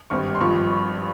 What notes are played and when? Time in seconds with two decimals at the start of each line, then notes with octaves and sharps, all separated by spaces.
0.10 G#1 G2 G3 C4 C#6
0.35 C6
0.40 G#1 G2 F3 C4 F4 C#6